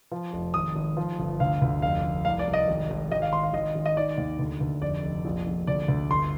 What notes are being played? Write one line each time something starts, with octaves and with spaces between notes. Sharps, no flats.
F3
F1
G#1 D#6
G#1
F3
G1
D2 F5
D2
F1 F5
F1
C2 F5
D5
C2
D#5
G#1
G#1
G#1 D#5
F5
G#1 C6
F5
G#1 D#5
G#1
D#5
D#3 D5
D#2
D2
D2
F1 D5
F1
A#1
A#1
D2 D5
D2
G1 C6